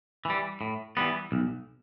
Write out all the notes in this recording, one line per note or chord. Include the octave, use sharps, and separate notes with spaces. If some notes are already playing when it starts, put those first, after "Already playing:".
E3 G3
A2
E3 G3 B3
B1